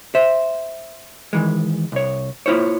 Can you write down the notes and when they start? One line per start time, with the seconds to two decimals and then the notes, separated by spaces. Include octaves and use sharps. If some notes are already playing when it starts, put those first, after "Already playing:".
0.15 C5 E5
1.33 D#3 E3 G#3
1.92 C2 C#5
2.46 A#3 E4 F4 C5 C#5